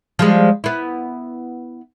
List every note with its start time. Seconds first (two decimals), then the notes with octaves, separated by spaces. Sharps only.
0.19 F3 G3 G#3
0.64 B3 E4